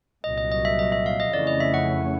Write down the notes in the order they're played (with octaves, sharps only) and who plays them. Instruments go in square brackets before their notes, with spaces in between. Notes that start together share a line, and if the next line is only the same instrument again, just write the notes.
[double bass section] C2 A#2 F#3 [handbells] D#5
[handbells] D#5
D#5
E5
D#5
E5
F5
D#5
[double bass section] F2 C#3 E3 A3 C#4 [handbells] D5
[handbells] D#5
E5
F#5